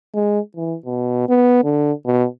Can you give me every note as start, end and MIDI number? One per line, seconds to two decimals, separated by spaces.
0.14 0.40 56
0.56 0.76 52
0.86 1.26 47
1.29 1.60 59
1.64 1.92 50
2.05 2.26 47